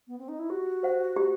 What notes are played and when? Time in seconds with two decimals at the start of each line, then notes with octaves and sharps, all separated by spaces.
0.08 B3
0.18 C4
0.28 D#4
0.39 E4
0.50 F#4 G4
0.83 C5 F#5
1.16 G4